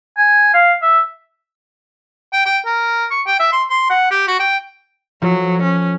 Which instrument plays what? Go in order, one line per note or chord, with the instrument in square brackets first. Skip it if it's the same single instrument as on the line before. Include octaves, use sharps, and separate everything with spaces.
[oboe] G#5
F5
E5
[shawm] G5
G5
A#4
C#6
G5
E5
C6
C6
F#5
G4
F#4
G5
[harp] F3 F4 A4 [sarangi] F#3
[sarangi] C#4